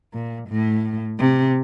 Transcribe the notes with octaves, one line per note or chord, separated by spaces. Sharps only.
A#2
A2
C3